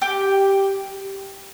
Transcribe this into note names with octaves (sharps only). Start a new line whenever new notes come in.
G4